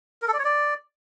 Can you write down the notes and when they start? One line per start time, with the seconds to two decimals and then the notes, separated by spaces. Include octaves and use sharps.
0.22 A#4
0.28 A4
0.33 D5
0.39 C#5
0.45 D5